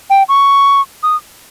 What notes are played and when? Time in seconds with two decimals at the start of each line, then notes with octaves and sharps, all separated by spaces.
0.10 G5
0.29 C#6
1.03 D#6